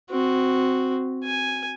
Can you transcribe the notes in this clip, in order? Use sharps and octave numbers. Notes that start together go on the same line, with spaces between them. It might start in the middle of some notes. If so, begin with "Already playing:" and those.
C4 F#4
G#5